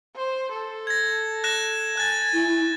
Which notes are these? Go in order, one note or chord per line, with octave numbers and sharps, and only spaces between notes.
C5
A4
G#6 A#6
F#6 A#6 E7
G#5 F#6 A6
E4